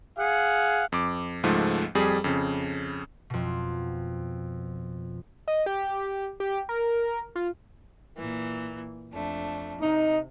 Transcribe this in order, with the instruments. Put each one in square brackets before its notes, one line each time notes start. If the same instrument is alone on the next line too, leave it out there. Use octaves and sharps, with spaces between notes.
[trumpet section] G#4 F5 F#5
[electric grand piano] F2 D6
C#2 G#2 F3 A3
F2 G3 G#4
F2 C#3
[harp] F2 B2
[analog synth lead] D#5
G4
G4
A#4
F4
[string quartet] A#2 E3
F2 A3 D4
[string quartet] C3 [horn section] D#4